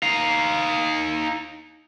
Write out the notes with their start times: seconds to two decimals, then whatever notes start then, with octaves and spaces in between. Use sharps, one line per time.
0.03 D#4 F5